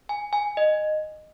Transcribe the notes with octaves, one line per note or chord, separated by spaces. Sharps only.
G#5
G#5
D#5